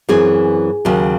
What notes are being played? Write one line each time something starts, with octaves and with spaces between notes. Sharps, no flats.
F#2 E3 C4 G#4
D#2 C#3 F#3